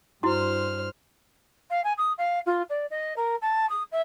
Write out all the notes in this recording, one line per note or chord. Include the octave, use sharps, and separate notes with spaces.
G2 E4 F#4 C5 C6 F6
F5
G#5
D#6
F5
F4
D5
D#5
A#4
A5
D#6
E5